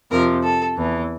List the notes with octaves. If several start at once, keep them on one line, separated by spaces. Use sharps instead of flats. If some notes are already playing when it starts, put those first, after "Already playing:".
F2 C3 F3 A#4
A4
E2 E3